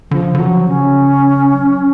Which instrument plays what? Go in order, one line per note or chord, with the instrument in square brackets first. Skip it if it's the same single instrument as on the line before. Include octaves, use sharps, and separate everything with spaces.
[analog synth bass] D3 [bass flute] F3
[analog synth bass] D3
[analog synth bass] F3 [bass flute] F#3
[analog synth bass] C#3 [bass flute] C#4
[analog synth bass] F#3